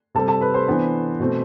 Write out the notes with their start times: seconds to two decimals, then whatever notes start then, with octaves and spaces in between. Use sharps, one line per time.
0.15 C3 G3 C4 A4 A5
0.28 A4 A5
0.41 B4 B5
0.54 C5 C6
0.67 E3 B3 D4
1.20 B2 A3 C4